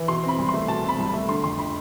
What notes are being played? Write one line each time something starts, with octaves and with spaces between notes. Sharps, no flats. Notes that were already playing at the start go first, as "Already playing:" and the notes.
Already playing: E3
B2 C6
C4
B5
C2
C6
A3
B2 A5
C4 B5
C2
A3 B5
D3 C6
F2 C6
B5